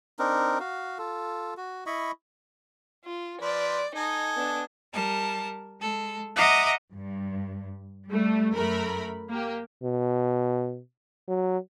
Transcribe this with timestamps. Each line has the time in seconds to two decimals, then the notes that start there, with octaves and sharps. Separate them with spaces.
0.19 C4 D4 D#4 A#4
0.60 F#4 F5
0.98 F4 A4
1.57 F#4
1.86 E4 D#5 B5 C#6
3.05 F4
3.42 F3 B4 C5 D5
3.96 D#4 A4 D#5 G#5
4.36 B3 D4
4.93 G3 A#4 A5
5.80 G#3 A4
6.36 D#5 E5 F#5 A#5 D6 D#6
6.94 G2
8.11 G3 A3
8.54 F#2 A3 A#4 B5
9.29 A#3 G4
9.83 B2
11.28 F#3